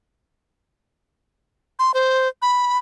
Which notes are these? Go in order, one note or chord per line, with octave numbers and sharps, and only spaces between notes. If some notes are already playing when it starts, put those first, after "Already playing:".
C6
C5
B5